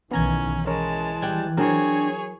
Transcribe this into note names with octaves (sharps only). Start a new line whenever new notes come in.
B1 D#3 E3 B3 C#4 A#5 G#6
E3 G#3 C#4 A#4 C#5 A5
G3 G5 F#6 G#6
F#3 C4 D4 G#4 A#4 C#5